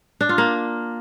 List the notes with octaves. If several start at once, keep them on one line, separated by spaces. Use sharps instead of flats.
D4
F4
A#3